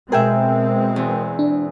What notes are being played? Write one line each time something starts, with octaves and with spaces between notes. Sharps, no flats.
B2 G#3 C4 G#4 A#4 E5 G5
E2
D4